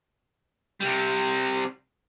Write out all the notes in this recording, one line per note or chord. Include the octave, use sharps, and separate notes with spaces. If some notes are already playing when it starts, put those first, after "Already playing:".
C3 G3